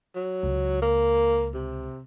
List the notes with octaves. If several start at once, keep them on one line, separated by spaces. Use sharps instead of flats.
F#3
C#2
A#3
C3